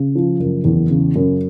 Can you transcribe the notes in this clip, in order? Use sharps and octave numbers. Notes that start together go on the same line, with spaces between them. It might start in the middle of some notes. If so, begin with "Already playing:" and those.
Already playing: C#3
F3
F#1
E2
C#3
F#2